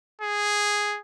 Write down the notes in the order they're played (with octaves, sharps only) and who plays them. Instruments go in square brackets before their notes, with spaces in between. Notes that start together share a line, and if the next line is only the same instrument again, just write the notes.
[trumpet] G#4